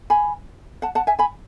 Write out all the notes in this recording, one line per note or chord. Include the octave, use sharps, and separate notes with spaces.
G#5 B5
F#5 A5
F#5 A5
E5 G#5
G#5 B5